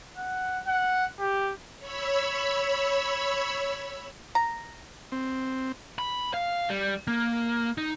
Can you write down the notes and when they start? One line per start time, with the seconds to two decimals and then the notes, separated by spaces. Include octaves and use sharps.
0.17 F#5
0.67 F#5
1.20 G4
1.79 C#5 B5 E6
4.35 A#5
5.12 C4
5.99 B5
6.34 F5
6.70 G3
7.08 A#3
7.78 D#4